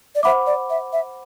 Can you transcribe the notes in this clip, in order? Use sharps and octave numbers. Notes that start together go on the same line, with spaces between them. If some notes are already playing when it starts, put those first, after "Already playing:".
D5
C5 E5 F#5 B5 D6
D5
E5
E5